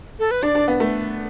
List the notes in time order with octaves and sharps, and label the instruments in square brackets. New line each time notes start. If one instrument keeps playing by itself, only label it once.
[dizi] A4
B4
[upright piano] D4 [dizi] D5
[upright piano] D4
B3
A3